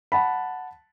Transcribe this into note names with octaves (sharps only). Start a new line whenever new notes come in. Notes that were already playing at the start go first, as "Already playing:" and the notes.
F#5 A5 B5